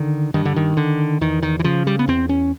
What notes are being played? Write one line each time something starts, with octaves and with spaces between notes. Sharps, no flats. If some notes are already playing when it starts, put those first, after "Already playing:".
Already playing: D3 D#3
G2 D#3
D3
D#3
D3
E2 D#3
D#3
E3
C#3 F3
G3
B3
E2 C4
C#4